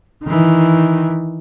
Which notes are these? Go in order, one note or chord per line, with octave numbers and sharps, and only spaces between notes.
D#3 E3